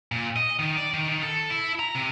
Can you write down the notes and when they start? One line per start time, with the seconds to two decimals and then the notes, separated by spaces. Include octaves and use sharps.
0.12 A#2
0.36 D#5
0.59 D#3
0.77 D5
0.94 D#3
1.09 D#3
1.23 A4
1.50 E4
1.79 A#5
1.95 C3